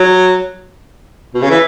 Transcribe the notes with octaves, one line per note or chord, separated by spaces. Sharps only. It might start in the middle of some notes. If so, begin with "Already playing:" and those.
Already playing: F#3
B2
C#3
E3